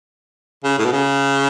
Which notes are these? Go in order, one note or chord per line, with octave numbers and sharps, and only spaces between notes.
C#3
A2
B2
C#3